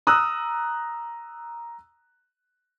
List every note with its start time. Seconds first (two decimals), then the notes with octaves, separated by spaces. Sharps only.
0.07 A#5 D#6 E6 F#6